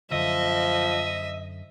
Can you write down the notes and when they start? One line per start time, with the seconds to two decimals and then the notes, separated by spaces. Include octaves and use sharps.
0.12 F#2 D3 F3 D#5 E5